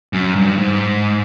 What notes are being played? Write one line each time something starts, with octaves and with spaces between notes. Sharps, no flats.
F#2
G2
G#2